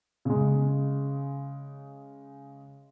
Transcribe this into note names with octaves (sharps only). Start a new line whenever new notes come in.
C#3 G#3